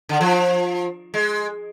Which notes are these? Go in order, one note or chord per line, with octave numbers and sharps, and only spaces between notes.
D3
F3
G#3